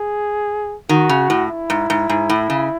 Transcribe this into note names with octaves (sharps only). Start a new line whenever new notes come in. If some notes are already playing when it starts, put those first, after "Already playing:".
Already playing: G#4
D#3 F#4
C#3
A2
E4
G#2
G#2
G#2
A2
C#3